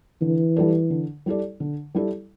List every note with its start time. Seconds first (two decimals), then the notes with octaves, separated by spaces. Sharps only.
0.22 D3 E3
0.56 G3 E4 A4 D5
0.90 D3
1.26 G3 E4 A4 D5
1.60 D3
1.95 G3 E4 A4 D5